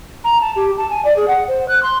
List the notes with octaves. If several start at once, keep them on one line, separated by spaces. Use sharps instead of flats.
A#5
A5
G4
A5
G#5
D5
G#4
F#5
C5
F#6
C6